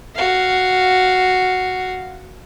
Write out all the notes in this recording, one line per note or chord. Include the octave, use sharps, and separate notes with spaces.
F#4 F5